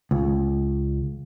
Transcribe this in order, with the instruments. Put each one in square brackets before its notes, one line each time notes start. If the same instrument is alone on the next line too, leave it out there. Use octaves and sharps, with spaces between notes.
[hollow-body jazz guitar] C#2